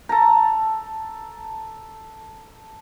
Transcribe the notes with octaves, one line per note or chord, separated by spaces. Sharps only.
A4 A5 A#5